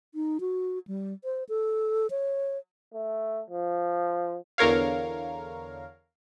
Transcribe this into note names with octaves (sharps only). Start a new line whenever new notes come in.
D#4
F#4
G3
C5
A4
C#5
A3
F3
E2 D3 A#4 C#5 F5